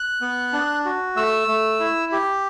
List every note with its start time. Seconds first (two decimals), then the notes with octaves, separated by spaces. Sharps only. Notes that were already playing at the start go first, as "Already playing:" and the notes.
Already playing: F#6
0.21 B3
0.53 D4
0.85 F#4
1.16 A3 E6
1.48 A3
1.80 E4
2.12 G4